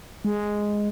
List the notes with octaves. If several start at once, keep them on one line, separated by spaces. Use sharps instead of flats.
G#3